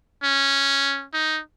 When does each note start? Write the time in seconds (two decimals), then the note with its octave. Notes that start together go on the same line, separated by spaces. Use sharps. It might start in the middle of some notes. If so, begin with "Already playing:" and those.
0.23 C#4
1.13 D#4